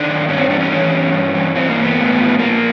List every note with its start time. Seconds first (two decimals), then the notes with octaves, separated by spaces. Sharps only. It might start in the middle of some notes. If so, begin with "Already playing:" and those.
Already playing: D#3 D4
0.09 F#2
0.28 G2 C#4
0.39 C4
0.50 E3 D4
0.60 C#4
0.72 E3
0.92 G2
1.13 G2
1.34 E3
1.55 E3 C4
1.69 A#3
1.76 G2
1.83 B3
1.98 A2
2.18 F3
2.39 F3 A#3